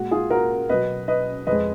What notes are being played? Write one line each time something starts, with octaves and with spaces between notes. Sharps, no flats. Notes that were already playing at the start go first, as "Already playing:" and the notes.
Already playing: A#2 G#3 F#4
F4 G#4
F#4 A#4
B2 F#3 B4 D#5
B4 D#5
F2 F3 G#3 B4 D#5